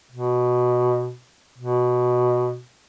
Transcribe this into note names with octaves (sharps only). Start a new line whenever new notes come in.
B2
B2